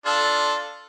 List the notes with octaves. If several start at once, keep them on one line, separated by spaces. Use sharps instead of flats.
D4 F4 A4